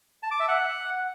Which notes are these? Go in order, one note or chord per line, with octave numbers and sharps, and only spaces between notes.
A5
D6
E5
F#5